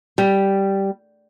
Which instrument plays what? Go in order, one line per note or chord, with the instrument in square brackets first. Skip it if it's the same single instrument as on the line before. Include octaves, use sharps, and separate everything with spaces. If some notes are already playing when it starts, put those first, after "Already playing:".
[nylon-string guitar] G3